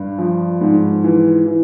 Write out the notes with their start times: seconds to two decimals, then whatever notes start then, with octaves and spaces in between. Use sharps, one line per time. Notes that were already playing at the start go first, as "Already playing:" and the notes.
Already playing: G2
0.18 F3
0.61 G#2
1.04 E3
1.46 E3